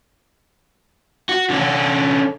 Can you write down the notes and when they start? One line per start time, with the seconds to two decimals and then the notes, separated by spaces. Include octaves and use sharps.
1.29 F#4
1.50 D3 C#4